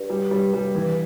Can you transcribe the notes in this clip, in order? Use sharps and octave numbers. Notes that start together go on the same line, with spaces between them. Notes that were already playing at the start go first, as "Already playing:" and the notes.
Already playing: G2
G3
G3
G3
E3